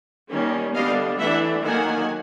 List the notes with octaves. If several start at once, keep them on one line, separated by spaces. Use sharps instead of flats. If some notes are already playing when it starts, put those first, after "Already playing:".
D#3 G3 A#3 C#4
D3 G3 B3 D4 D#5 F5
E3 A3 D4 E5 F#5
D#3 F#3 A#3 F#5 G#5